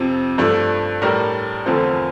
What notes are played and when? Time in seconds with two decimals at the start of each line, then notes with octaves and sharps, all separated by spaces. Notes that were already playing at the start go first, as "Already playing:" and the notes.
Already playing: F2 C3 F3 C4
0.38 G2 F3 A3 D4
1.02 A2 G3 D4 A#4
1.66 E2 D3 F3 A3 C4